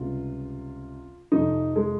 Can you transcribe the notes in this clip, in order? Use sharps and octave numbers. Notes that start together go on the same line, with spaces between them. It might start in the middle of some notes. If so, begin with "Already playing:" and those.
Already playing: C#2 C3 G3 F4
F2 C3 F3 D#4
G#3